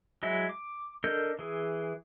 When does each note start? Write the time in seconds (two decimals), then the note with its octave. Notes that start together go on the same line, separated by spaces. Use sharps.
0.23 F#3 G#3 E4 E5
0.49 D6
1.04 D4 A4 A#4 D#5 G6
1.39 E3 G#4